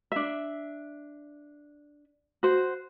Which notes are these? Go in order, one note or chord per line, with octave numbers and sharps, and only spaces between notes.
D4 E5
F#4 C5